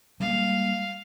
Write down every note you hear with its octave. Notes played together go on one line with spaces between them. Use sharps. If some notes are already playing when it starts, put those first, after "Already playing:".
G3 G#3 A#3 F5